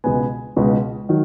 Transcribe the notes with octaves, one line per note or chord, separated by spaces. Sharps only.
C#2 B2 G#3 B3 G#5
C#2 B2 G#3 B3
D#3 F#3